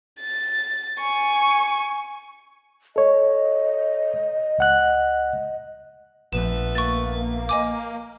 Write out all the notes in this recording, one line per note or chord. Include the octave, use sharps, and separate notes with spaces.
A6
G#5 C#6
A4 C#5 D#5
C#2 F#5 F#6
A#1 A3 B3 B4 E7
A#3 C#6 A6
D#5 G#5 D6